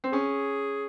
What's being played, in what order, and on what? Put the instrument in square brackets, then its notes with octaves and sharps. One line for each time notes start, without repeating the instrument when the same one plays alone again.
[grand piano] C4
[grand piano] C#4 [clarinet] G#4